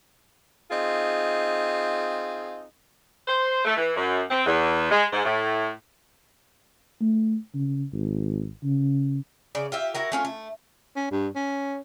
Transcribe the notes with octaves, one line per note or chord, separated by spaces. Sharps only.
C4 D#4 F4 G#4
C5
A3
E3
F#2
C4
E2
G#3
G#2
A2
A3
C#3
G#1
C#3
C#3 D5
F4 G4 E5
E4 F#4 A#4
A3 C#4 F4
A3
C#4
G2
C#4